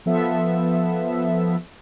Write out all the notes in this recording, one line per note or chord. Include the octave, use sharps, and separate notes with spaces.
F3 B3 A4 E5